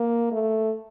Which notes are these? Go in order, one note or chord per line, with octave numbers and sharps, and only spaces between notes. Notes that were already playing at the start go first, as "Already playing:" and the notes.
Already playing: A#3
A3